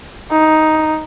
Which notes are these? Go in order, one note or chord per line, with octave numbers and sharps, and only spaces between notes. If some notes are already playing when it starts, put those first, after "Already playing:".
D#4